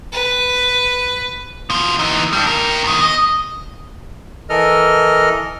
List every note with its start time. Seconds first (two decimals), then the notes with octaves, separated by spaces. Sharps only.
0.12 B4
1.70 B2 F4
1.99 E3 D#4
2.33 G2 G3
2.47 G4 A#4
2.83 E2 D#3
3.01 D#5
4.49 E3 A4 A#4 D#5 F6